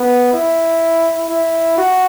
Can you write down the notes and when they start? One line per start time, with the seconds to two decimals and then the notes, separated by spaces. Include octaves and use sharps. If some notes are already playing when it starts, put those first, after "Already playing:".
Already playing: B3
0.33 E4
1.29 E4
1.78 F#4